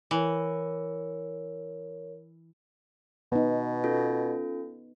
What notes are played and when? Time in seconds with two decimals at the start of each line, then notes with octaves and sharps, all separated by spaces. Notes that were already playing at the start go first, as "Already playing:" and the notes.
0.11 E3 A#4 C#5
3.32 B2 B3 D#4
3.84 C#4 F4 A4